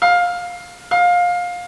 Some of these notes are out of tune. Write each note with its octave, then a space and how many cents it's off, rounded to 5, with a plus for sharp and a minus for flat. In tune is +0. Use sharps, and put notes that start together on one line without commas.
F5 +15
F5 +20